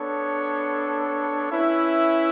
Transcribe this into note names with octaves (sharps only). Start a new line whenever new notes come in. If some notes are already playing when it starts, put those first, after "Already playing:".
Already playing: B3 D4 A4 C#5
C#4 E4 B4 E5